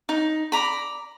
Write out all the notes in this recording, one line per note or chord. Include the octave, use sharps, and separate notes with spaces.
D#4
D5 A#5 B5